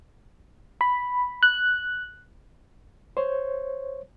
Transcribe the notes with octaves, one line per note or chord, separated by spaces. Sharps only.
B5
F#6
C5 C#5